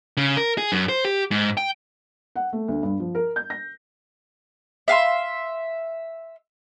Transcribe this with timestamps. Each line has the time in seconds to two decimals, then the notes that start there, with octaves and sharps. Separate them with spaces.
0.17 C#3
0.37 A#4
0.58 G#4
0.72 F#2
0.89 C5
1.05 G4
1.31 G#2
1.57 G5
2.36 F#5
2.53 A3
2.68 D2
2.83 G2
3.00 F3
3.15 A#4
3.36 G6
3.50 A#6
4.88 E5 F5 G#5 C6